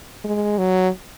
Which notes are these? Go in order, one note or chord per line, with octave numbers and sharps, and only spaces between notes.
G#3
F#3